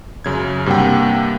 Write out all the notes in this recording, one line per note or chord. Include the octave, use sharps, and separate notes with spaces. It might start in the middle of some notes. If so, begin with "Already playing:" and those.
F#2 C#3 G#6
G2 C3 A#3 F#5 G5